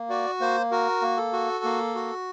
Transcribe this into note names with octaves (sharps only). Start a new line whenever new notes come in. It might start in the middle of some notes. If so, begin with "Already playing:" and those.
Already playing: A#3
F#4 D5
A#3 C5
F#4 A#4
A#3
A4
F#4
A#3
F#4